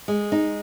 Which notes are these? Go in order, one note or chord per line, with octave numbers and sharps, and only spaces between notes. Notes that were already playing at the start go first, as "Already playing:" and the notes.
G#3
D#4